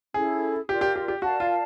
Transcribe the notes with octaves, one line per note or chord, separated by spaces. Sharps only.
C#4 E4 G#4 A4
F4 G4 A#4 D5
G4
G4
G4
F#4 A#4 D5 F5 A5
F4